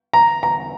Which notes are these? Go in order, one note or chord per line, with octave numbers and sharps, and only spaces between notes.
A#5
A#5